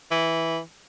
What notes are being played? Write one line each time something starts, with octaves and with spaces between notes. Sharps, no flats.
E3